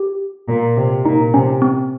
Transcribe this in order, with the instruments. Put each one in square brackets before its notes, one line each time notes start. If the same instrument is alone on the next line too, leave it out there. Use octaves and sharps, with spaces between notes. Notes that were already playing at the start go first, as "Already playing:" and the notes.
Already playing: [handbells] G4
[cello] A#2
C3
[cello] A#2 [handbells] D#4
[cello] C3 [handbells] C#4
[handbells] C4